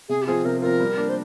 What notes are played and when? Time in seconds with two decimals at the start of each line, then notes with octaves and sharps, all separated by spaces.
0.09 C3 G#4
0.22 G4
0.26 F3 C4 F4 G#4
0.45 C3 A#4
0.62 F3 C4 F4 A#4
0.80 G3
0.97 A#3 D4
1.09 C5